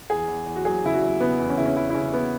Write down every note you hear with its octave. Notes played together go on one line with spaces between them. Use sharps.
E2 G#4
E2
E2
F#4
F#3 G#4
C#3 E4
F#4
F#3
C#3 B3
E2
C#4
C#3 E4
C#4
E2 E4
E4
C#3 C#4
B3